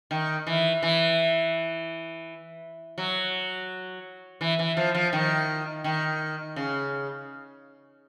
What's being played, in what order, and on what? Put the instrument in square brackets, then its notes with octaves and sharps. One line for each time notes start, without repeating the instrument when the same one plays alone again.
[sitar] D#3
E3
E3
F#3
E3
E3
F3
F3
D#3
D#3
C#3